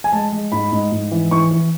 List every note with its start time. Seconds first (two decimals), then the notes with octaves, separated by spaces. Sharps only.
0.04 G#5
0.13 G#3 A5
0.32 G#3
0.52 G#2 B5
0.72 G#2
0.92 G#2
1.11 E3
1.31 E3 C#6
1.51 E3